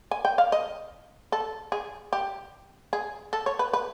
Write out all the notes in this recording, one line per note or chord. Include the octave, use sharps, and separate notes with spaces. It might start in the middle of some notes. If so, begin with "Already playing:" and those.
G#5
G5
F5
D#5
A4
G#4
G4
G#4
A4
C#5
B4
B4